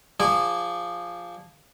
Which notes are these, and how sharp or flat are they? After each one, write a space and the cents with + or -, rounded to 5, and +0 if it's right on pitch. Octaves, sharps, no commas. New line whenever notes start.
F3 +0 G#4 -25 D5 +0